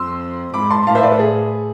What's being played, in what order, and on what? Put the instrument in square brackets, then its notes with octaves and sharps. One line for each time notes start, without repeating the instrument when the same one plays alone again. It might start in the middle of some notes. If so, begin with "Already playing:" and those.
Already playing: [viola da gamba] F2 [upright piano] C6 E6
[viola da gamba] G#2 [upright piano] B5 D6
[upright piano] A5 C6
[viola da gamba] A2 [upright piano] F5 A5
[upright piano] C5 E5
B4 D5
A4
G#4